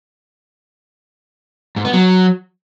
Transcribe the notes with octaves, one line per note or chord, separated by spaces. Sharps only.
G#2
B3
F#3